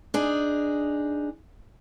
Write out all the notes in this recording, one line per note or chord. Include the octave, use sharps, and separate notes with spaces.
D4 D#4 G#4